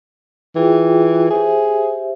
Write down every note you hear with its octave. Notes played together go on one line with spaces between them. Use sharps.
E3 F4 G#4 G5
G4 G#4 C5 E5